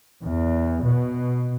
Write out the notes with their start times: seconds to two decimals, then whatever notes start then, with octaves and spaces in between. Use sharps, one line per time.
0.24 E2
0.86 B2